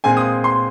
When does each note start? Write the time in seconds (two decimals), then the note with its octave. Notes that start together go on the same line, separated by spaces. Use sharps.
0.04 A#2 G#3 C4 G#5
0.17 D#6
0.44 C6